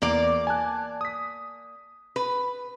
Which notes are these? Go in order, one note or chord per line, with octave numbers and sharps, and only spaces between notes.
E2 A#3 D5
G#5 A5 F#6
D#6 B6
B4